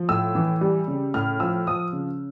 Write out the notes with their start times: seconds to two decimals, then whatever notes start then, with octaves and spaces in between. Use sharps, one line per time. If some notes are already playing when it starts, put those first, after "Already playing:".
Already playing: F3
0.09 A2 E6
0.35 E3
0.61 G3
0.88 C#3
1.14 A2 F6
1.40 F3 E6
1.67 F3 D#6
1.93 C#3